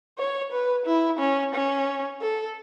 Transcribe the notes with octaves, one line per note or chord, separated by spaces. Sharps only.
C#5
B4
E4
C#4
C#4
A4